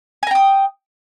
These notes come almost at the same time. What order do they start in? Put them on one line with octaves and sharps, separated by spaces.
G#5 A#5 G5 D#6